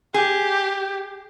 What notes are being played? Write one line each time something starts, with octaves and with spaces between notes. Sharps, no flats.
G4 G#4